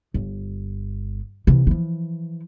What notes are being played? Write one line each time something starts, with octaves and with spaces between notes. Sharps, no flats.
G1
C3 E3
E3 F3